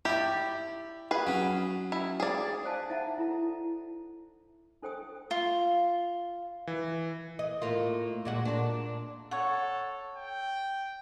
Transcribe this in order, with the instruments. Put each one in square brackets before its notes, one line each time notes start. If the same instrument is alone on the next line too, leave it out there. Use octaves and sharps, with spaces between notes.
[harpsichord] E4 D5 [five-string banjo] G4
[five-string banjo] G#4 B4
[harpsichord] F#3 C#4
[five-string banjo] E4
G#4 D5
[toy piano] C5 D5 F5 G#5 A5
D#4 E5 F#5 A5 A#5
E4 A4 A#5
D4 A4 C5 G5 G#5 D#6
[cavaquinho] F4
[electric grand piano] E3
[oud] D#5
A2 A#3 F4
A#2 G#3 F#4
A#2 D4
[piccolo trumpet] A4 [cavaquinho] C#5 F#5
[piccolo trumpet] G5